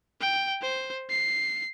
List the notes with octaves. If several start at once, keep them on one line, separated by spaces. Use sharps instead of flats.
G5
C5
C7